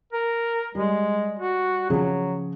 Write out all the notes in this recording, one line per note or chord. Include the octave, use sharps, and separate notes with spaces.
A#4
G3 G#3
F#4
C#3 F3 F#3 G#4